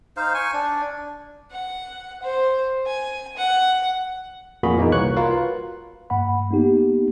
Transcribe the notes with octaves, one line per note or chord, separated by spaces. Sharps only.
D#4 C5 F5
G#5 C#6
D4
F#5
C5
G#5
F#5
F2 A#2 A#3 F#4 G#4 B5
E3 A#3 B3 D#4
C2 C#5 C#6 F#6
F4 F#4 A#4 B4 F5
G2 A#3 F#5 B5
A#3 B3 D#4 G4